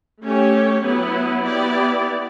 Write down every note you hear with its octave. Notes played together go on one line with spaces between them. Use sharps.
A3 C#4 G4 C#5
F#3 B3 E4 B4
B3 E4 G4 D5